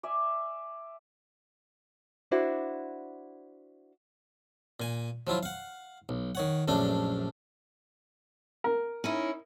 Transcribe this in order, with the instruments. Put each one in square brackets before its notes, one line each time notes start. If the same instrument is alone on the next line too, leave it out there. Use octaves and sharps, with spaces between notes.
[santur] D5 E5 G#5
[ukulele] D4 E4 F#4 C5
[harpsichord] A#2 G#5
F3 F#3 E4 F4
F5 F#5
B1
D#3 C#5 F#5
A#1 F#2 A3 D4
[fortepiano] A#4
[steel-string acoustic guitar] C#4 D#4 E4